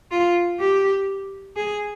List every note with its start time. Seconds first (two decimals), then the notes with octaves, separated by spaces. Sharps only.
0.11 F4
0.59 G4
1.56 G#4